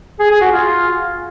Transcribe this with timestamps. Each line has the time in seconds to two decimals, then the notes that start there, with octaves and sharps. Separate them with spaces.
0.20 G#4
0.30 G#4
0.41 F#4
0.52 F4